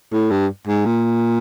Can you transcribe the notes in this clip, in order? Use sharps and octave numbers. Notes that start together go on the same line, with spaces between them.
A2
G2
G#2
A#2